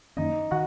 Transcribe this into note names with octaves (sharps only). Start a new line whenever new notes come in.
F#2 D#3 A#3 C#4 D#4 D#5
D#3 F#4 F#5